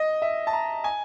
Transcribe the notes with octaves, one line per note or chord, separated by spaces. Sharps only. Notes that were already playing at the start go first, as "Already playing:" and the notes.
Already playing: D#5
E5
A5
A#5
G#5